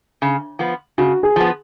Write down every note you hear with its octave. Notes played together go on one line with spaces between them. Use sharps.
C#3
F3 B3
C#3 F#4
G#4
F3 B3